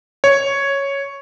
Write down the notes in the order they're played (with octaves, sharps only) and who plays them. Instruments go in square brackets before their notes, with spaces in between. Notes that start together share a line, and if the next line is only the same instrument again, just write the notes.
[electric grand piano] C#5